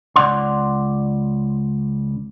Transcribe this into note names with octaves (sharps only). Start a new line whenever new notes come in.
C#2 D5 F#5 C6